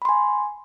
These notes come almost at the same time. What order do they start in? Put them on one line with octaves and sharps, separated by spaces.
B5 C6 G#5